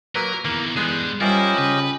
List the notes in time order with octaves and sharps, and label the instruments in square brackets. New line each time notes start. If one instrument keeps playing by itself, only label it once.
[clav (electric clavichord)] F#3 A#3 B4 [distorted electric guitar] A#4
[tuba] E2 [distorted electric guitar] D#3 E3 [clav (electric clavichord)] A#3
[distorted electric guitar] G3 D4 [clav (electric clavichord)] G#3 B3 G#4
[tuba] G3 [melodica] C#4 G4 D#5 [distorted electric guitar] E4 [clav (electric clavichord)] F4 A#4 C5
[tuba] C#3 [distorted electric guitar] B4